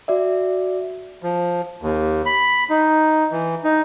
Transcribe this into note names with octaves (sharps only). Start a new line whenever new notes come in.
F#4 D5 E5
F3
D#2
B5
D#4
E3
D#4